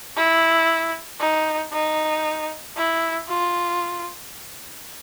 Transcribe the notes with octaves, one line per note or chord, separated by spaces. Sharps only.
E4
D#4
D#4
E4
F4